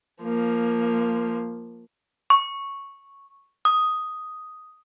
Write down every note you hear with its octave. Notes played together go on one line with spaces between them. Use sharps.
F3 A#3
C#6
D#6